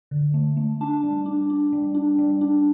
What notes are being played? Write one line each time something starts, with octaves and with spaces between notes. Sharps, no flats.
D3
A3
A3
D4 A5
G3
D4
D4
G3
D4
G3
D4